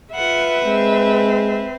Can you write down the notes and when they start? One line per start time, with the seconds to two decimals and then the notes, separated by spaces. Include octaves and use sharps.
0.15 F4 B4 E5 F#5
0.65 G#3 C4